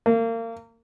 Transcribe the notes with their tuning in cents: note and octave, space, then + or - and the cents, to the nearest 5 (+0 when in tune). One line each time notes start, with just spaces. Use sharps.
A#3 -30